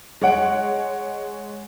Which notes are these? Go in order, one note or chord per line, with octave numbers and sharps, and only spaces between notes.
G#3 C#5 F#5 D7